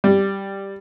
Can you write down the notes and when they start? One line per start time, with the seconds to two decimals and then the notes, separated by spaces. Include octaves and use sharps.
0.04 G3